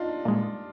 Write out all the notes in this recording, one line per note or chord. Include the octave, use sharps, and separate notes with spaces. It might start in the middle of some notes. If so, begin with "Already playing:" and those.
Already playing: D4 D#4 F4
A#2 G#3